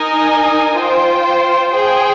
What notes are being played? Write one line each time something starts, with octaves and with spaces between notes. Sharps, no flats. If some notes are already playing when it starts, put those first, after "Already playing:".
Already playing: D#4 A#4 D#5 G#5
F4 C5 G5
G#4 C5 G5